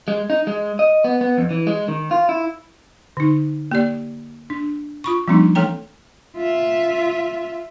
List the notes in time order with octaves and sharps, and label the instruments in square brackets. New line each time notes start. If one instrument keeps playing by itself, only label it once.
[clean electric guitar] G#3
D#4
G#3
D#5
B3
B3
F2
E3
G#3
D#3
F4
E4
[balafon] D3 D#4
A#3 G4 D5
D4
F4 B5 C#6
F3 G3 A#3 C4 D4 D#4
E3 A3 A4 C#5 G5 A#5
[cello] F4 E5